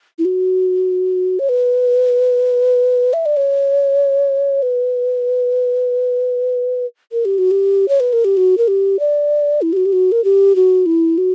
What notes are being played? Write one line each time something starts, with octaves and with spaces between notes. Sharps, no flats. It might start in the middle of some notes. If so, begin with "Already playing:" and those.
E4
F#4
C#5
B4
E5
D5
C#5
B4
A#4
G4
F#4
G4
C#5
B4
A#4
G4
F#4
A#4
G4
D5
E4
G4
F#4
G4
F#4
A#4
G4
F#4
E4
F#4